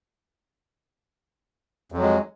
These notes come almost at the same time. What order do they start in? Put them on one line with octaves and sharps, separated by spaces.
F2 F#3 G#3